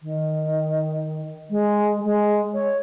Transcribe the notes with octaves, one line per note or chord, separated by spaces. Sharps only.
D#3
G#3
G#3
C#5